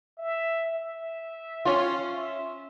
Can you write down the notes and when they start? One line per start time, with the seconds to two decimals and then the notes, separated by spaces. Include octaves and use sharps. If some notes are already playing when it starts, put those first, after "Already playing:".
0.18 E5
0.77 E5
1.65 C#4 F4
2.13 E5